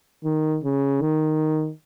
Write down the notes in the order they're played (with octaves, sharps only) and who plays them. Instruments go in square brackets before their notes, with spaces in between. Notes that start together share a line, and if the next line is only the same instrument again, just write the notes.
[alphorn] D#3
C#3
D#3